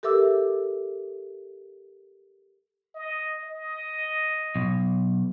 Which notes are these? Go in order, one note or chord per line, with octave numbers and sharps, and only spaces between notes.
G4 A4 A#4 E5 D6 E6
D#5
D#5
B1